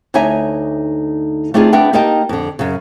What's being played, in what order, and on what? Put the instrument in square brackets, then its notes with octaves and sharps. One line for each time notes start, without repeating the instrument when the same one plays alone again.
[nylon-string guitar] D2 D#4 C#5 E5 G#5
A3 C4 D4 D#4 F4 G#4
B3 D4 E5 G5
A#3 D#4 G4 D#5 G5 A5
F2 D3
F#2 C#3